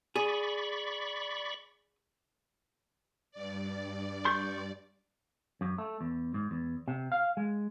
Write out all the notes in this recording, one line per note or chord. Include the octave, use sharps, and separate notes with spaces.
G#4 D5 B5 C#6
G2 D5
C6 C#6 G6
F#2
A3
E2
G#2
E2
C3
F5
G#3